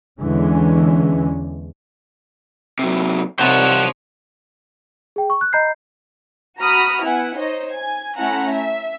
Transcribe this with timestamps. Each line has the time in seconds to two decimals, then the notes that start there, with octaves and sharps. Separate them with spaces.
0.20 E2 D3 E3 G#3 C#4
2.79 C3 F#3
3.39 C2 C3 D#4 C5 C#5 F#5 A5
5.16 G#4 G5
5.30 C#6
5.41 F#6
5.53 D#5 A#5 B5 G6 C7
6.59 F#4 A#5 B5 D#6 F6
7.03 B3 E4 F#5 G#5
7.35 D#4 C5 C#5 D#5
7.72 G#5 G#6
8.16 A3 C#4 E4 F#5 G#5 A#5
8.54 E5